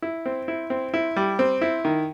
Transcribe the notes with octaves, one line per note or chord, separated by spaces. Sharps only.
E4
C4
E4
C4
E4
G3
C4
E4
D#3